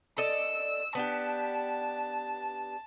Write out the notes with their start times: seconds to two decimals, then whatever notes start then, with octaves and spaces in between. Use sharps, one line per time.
0.18 A4 D5 D#5 E6
0.95 B3 D4 G4 A5